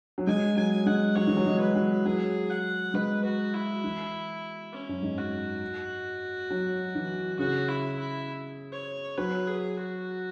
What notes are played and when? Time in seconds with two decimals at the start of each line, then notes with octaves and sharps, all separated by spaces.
0.18 F#3
0.27 G#3 G#5
0.56 F#3 G#5
0.86 G#3 F#5
1.16 F#3 C#5
1.27 E3
1.37 F#3
1.47 G#3
1.60 B4
1.75 F#3
2.05 F#3 G#4
2.50 F#5
2.94 G#3 B4
3.25 F#4
3.54 E4
3.84 E3
4.72 C#4
4.89 F#2
5.02 G#2
5.17 F#4
6.50 F#3
6.95 E3
7.39 C#3 F#4
7.69 E4
7.99 E4
8.73 C#5
9.17 F#3 B4
9.47 G#4
9.76 F#4